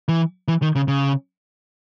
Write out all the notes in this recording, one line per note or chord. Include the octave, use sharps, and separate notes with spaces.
E3
E3
D#3
C#3
C#3